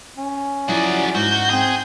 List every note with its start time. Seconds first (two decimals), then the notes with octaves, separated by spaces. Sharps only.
0.17 C#4
0.69 F3 F#3 E4 F#4 G#4 D5
1.15 G#2 F#4 G6
1.50 C4 G#4